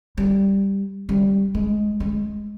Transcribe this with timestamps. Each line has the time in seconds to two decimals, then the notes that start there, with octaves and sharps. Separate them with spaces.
0.17 G3
1.09 G3
1.55 G#3
2.00 G#3